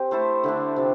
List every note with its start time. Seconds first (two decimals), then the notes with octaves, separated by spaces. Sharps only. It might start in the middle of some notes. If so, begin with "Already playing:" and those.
Already playing: C4 G4
0.11 A3 E4 A4 C5
0.44 D3 A3 D4
0.76 C3 F3